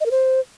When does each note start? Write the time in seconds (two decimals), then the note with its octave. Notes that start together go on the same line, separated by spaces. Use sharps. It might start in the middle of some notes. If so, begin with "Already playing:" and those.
0.01 D#5
0.06 A#4
0.11 C5